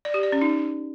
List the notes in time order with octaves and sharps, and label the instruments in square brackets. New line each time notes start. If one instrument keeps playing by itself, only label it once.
[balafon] D5
G4
D5
C#4
D#4